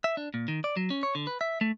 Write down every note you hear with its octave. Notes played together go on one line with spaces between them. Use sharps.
E5
D4
A#2
D#3
D5
F#3
C#4
C#5
D3
B4
E5
A3